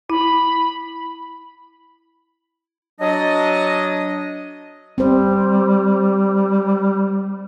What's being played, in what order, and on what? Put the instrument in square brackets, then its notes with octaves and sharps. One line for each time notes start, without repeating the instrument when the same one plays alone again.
[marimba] E4 [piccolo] B5
[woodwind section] F#3 D4 D#5
[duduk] G3 [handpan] C4 C5